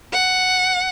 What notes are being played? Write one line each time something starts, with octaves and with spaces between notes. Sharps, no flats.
F#5